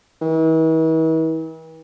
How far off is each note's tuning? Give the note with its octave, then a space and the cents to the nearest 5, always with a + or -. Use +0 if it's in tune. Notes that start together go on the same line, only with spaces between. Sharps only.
E3 -45